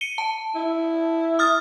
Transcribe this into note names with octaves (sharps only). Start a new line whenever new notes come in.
C#7 D#7 G7
A5
E4
D#6 F6 A6